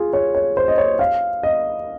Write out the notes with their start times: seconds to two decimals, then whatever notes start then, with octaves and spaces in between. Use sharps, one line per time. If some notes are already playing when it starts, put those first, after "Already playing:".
Already playing: F4 G#4
0.13 C#5
0.35 C#5
0.57 C5
0.68 D#5
0.78 C#5
0.99 F5
1.43 D#5